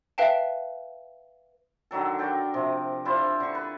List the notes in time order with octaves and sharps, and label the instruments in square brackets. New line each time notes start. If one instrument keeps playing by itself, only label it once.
[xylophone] B4 E5 F5 G5 A5
[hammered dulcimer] D3 D#3 F#3 A4
F#4 A#4 D5 G5
C3 F3
D4 E4 F4 C5
D3 C#6
B4